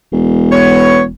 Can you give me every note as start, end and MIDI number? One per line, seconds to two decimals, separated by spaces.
0.12 1.11 28
0.52 1.02 59
0.52 1.02 73